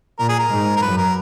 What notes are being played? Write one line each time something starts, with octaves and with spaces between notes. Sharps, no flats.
A#2 A#4
G#4
A#4
G#2
A#4
F#2 B4
A#4